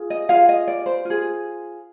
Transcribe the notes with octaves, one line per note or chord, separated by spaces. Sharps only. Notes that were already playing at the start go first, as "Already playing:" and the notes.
Already playing: F4 G#4
D#5
F4 G#4 F5
D#5
D5
C5
F4
G#4